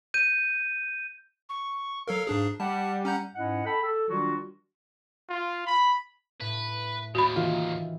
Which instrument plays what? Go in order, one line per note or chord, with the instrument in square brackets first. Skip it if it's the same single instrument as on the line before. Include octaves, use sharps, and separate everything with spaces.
[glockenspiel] G6 D#7
[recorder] C#6
[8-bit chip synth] F#3 A4 A#4 [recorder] F5
[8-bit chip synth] G#2 D4 G#4
[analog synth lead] G3 [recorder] F#5 [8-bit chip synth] A5
[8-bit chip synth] C#4 A#5 G6 [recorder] F#5
[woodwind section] G#2 C#4 E4 D#5 F#5
A4 G5 A5 B5
A4
D#3 F#3 G3 D4 F4 F#4
[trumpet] F4
B5
[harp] A2 [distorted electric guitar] B4
[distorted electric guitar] D#2 A#2 [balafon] F#4 B5
[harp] D#3 E3 [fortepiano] F4